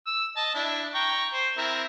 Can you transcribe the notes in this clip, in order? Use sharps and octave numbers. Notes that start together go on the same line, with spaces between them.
E6
D#5 A5
D4 E4
G5 A#5 C#6
C5
C4 E4 A#4